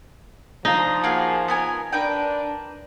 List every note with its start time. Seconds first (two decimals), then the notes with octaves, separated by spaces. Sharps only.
0.65 F3 D4 D#4 F5
1.04 A#3 F#4 G#4
1.48 B3 A#4 G#5
1.92 D4 A#4 B4 G5